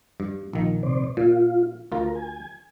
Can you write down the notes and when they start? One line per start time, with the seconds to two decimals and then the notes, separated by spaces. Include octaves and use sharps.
0.20 G2
0.53 A#1 D#3
0.83 C3 C5 D5
1.17 A#2 F4
1.92 D2 F4 A#4
2.15 G#5